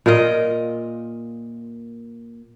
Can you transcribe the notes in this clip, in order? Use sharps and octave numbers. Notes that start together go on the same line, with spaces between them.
A#2 F4 A#4 D#5